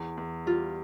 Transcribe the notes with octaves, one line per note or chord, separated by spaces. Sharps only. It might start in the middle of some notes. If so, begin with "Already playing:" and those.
Already playing: E2
E2
G3 F4